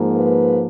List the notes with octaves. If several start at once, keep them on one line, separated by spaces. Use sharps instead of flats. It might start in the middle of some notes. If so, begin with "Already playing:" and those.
Already playing: G#2 F3 A#3
B4